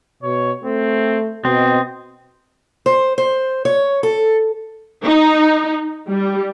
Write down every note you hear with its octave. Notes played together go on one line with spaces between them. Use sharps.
B2 C#5
A3 C4
B2 C4 D#5
C5
C5
C#5
A4
D#4
G3